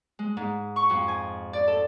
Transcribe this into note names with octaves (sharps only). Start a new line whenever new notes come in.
G#3
G#2
C#6
F2
G#5
D5
A4